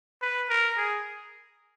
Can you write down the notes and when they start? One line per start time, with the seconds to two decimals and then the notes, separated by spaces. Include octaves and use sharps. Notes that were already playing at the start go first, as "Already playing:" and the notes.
0.22 B4
0.50 A#4
0.78 G#4